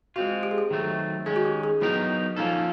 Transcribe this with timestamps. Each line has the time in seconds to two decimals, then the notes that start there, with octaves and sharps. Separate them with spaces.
0.16 G#3 C4 F4 F#4
0.43 G4
0.51 G#4
0.58 G4
0.70 D#3 F#3 A3 C4
1.26 D#3 G#3 C#4 G#4
1.36 F#4
1.45 G4
1.63 G#4
1.81 F#3 B3 D#4 E4 G4 A#4
2.36 F3 A#3 C#4 D#4 F4 A4